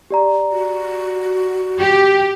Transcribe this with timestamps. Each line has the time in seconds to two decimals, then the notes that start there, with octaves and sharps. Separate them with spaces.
0.11 G4 D5 A#5
0.51 F#4
1.80 G4